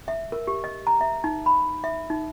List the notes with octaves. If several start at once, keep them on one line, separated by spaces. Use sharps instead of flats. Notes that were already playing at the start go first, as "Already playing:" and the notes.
E5
A#4
G4
D#5
A#5
E5
D#4
B5
E5
D#4